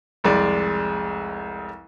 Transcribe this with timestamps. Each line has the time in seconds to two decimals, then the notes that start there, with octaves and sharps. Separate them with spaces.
0.24 F1 C2 G#3 D5